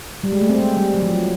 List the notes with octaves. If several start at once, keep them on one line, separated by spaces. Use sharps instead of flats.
G3
G#3
A3
C4
G#3
G3
F#3
F3
F#3